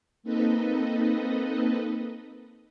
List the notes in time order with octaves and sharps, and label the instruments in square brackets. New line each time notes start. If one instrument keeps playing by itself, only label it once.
[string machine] A#3 C4 D#4 A4 B4 D#5